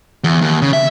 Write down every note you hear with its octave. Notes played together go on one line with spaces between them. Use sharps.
E2
D#2
C#3
E5